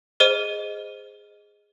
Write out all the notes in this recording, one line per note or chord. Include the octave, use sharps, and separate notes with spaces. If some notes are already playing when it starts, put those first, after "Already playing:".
G#4 C5 D#5 F6 D#7